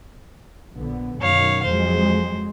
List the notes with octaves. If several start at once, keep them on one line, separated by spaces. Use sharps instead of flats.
A#1 D3 B3
F#2 B2 D#3 C#5 F5
F2 F#3 G#3 C5